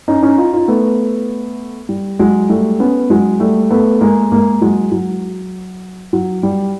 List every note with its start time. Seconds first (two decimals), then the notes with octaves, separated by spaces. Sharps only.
0.08 C#4 D#4
0.23 C#4 D#4
0.38 D#4 F4
0.53 D#4 F4
0.68 A3 B3
1.89 G3
2.19 F#3 G#3
2.49 G3 A3
2.80 B3 C#4
3.10 F#3 G#3
3.40 G3 A3
3.70 A3 B3
4.01 G#3 A#3
4.32 G#3 A#3
4.61 F#3 G#3
4.92 F#3
6.13 F#3
6.43 G3